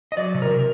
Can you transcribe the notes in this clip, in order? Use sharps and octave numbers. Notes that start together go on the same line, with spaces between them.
D#5
F#3 D5
C3
A#4
C3